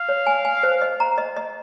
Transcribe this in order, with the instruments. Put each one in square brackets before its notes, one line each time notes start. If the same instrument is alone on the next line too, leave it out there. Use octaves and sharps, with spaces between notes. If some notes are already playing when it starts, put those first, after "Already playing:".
Already playing: [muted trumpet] F5
[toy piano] C#5
G#5
G#5
C5
D#5
A#5
D#5
D#5